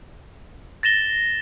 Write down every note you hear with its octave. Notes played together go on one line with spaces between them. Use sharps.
A6 A#6 E7 G7